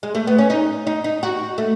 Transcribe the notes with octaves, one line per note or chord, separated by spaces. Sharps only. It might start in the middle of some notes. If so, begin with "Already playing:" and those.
G#3
A3
B3
C#4
D#4
D#4
D#4
F#4
A3